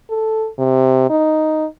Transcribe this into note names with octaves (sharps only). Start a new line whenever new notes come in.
A4
C3
D#4